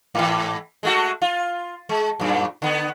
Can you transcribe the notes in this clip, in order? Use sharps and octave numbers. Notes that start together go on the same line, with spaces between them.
G#2 E3
G#3 A3 F#4
F4
G#3
F#2 A#2
D3 B3